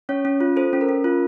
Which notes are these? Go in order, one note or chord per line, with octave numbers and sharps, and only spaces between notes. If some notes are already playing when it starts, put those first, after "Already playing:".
C#4 C#5
C#4
F4
A4 C5
C#4
A#4
C#4
F4